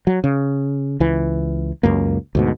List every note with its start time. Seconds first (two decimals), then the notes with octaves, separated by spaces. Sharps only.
0.07 F#3
0.24 C#3
1.00 C#2 E3
1.83 C#2 F#2 A#3
2.35 D2 G#2 B2